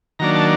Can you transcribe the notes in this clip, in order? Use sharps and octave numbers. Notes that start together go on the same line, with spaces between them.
D#3 F#3 A#3 D4 A#5
A5